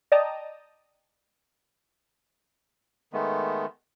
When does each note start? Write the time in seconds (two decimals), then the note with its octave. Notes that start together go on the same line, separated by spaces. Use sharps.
0.12 D5 D#5 G5 A5 A#5 D#6
3.13 D#3 G#3 A3 B3